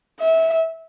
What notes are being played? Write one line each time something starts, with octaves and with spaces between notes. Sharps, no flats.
E5